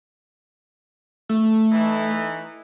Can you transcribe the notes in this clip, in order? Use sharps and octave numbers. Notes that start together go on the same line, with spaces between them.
A3
E3 D#4